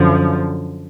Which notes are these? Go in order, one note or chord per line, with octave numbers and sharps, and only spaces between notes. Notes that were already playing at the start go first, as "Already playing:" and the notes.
Already playing: F#2 D3 F3